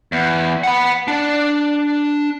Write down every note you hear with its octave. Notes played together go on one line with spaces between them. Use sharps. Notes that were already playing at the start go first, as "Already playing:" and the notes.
E2
F#5 B5
D4